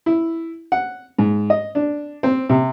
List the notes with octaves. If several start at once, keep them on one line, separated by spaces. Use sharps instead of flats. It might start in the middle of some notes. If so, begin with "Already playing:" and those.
E4
F#5
G#2
D#5
D4
C4
C3